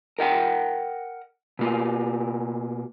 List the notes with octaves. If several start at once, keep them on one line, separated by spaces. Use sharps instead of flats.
A#4 D#5 F#5 G5
B2 A#3